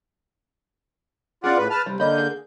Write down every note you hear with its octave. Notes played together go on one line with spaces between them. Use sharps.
C#4 F4 G#4 D5 F#5
A2 B4
B4 A5 F6
C3 G3
D3 A#3 D5 D#5 B5 G6
G#4